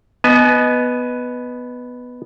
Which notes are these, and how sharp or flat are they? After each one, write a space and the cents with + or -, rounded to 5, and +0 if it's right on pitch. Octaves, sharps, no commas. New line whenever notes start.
B3 +0 D#5 +0 G#5 +40